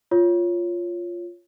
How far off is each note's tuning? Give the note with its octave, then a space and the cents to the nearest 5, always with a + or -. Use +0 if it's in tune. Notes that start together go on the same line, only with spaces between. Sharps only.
F4 +0 C#5 +0